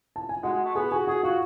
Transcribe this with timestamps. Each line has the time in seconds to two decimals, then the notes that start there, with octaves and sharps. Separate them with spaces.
0.16 A5
0.29 G#5
0.43 G#3 F#4 F#5
0.53 G#3
0.64 A3
0.75 B3 G#4 G#5
0.91 F#4 G#4 G#5
1.07 F#4 G#4 F#5
1.23 F4 F#4 F5